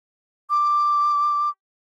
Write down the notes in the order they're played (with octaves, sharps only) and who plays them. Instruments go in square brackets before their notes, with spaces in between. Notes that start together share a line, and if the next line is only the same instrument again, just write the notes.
[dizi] D6